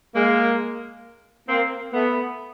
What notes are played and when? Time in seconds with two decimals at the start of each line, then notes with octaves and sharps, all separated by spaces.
0.15 G#3 A#3
1.49 A#3 C4
1.93 A3 B3